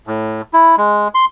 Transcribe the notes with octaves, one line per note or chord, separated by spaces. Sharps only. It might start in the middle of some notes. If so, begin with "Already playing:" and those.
A2
E4
G#3
C6